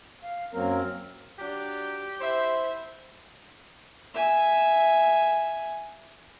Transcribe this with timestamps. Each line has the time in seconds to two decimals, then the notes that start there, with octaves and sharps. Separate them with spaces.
0.24 F5
0.53 F#2 F#3 A#3 C4 A#4
1.39 F#3 D4 G4
2.21 E4 C5 E5
4.14 E5 G#5